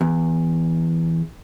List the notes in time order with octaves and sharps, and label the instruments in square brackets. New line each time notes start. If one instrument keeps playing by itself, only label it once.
[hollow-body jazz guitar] E2